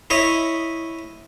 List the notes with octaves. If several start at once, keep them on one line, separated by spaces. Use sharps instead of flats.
E4 C#5 D#5